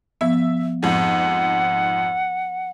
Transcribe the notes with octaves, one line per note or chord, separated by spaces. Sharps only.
F3 B3 E5
F2 G#2 F#5